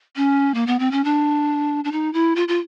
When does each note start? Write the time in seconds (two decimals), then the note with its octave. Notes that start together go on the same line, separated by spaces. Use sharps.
0.16 C#4
0.54 A#3
0.67 B3
0.79 C4
0.92 C#4
1.04 D4
1.84 D4
1.92 D#4
2.14 E4
2.36 F4
2.48 F4